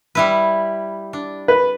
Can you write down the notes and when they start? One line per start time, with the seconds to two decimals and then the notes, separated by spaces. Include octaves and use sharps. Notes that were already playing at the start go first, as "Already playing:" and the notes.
0.15 G3 E4 B4
1.13 D4
1.48 B4